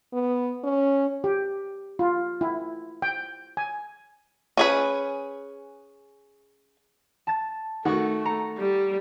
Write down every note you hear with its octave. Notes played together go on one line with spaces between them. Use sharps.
B3
C#4
G4
F4
E4
G5
G#5
C#4 G#4 B4
A5 A6
D#3 A3 F#4 F#5 C#6
A#5 C#7
G3